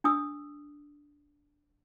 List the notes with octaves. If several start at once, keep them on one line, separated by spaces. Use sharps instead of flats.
D4 D#6 E6